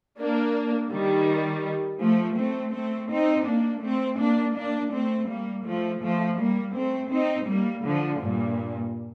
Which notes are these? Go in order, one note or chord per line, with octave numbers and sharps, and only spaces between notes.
A#3 D4
D#3 G3
F3 A3
A3 C4
A3 C4
C4 D#4
A#3 D4
A3 C4
A#3 D4
A#3 D4
A3 C4
G3 A#3
F3 A3
F3 A3
G3 A#3
A3 C4
C4 D#4
G3 A#3
D3 F3
G2 A#2